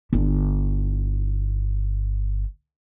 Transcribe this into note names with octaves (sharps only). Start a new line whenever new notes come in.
G1 E4